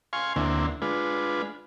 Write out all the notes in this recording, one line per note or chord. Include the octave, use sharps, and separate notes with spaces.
F5 G#5 C6 C#6
D2 D3 A#3 C4 E4
G#3 D4 F4 B4